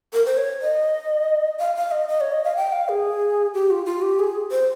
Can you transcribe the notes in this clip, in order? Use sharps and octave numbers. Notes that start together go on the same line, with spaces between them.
A#4
C5
C#5
D#5
F5
F5
D#5
D#5
C#5
D#5
F5
G5
F5
G#4
G4
F4
F4
G4
G#4
C5